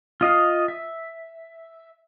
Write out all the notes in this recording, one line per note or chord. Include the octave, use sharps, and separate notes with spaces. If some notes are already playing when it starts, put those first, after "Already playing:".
F4 D#5 F5 D#6
E5